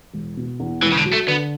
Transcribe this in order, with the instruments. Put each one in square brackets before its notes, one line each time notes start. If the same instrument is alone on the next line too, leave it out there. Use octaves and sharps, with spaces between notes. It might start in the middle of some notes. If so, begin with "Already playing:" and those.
[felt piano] E1
B2
E2
[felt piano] E1 [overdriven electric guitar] E3
[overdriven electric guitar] C#3
D3
[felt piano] F#3
[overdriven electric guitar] A3
[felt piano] D3 [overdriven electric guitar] B3